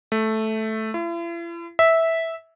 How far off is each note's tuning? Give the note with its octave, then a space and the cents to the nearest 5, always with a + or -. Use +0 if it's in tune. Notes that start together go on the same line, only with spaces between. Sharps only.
A3 -5
E4 +45
E5 -10